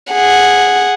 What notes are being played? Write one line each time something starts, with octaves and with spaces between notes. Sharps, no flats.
G#4 F#5